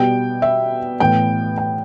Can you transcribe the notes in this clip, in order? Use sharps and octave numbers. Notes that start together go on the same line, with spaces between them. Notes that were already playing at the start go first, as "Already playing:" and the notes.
Already playing: B2 G3 B3 G5
E5
A2 E3 B3 G5
G5